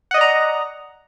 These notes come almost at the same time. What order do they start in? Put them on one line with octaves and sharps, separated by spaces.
F#5 D#5 D5 A#5